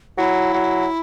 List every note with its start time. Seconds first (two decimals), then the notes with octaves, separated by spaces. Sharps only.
0.17 F#3 E4
0.54 F#3